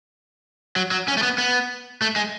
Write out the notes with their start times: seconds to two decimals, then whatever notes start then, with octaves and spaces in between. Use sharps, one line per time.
0.76 F#3
0.91 F#3
1.08 C#4
1.17 A3
1.23 B3
1.38 B3
2.02 A3
2.16 G#3